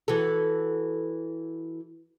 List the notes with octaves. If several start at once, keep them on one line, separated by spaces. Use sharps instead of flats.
E3 F#4 A4